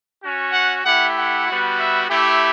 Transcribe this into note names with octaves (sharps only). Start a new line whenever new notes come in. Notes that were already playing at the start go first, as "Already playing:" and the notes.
C#4 F#4
F#5
A3 E4 G4 F#5
F#5
G3 B3 F#4
E5
A3 E4 G4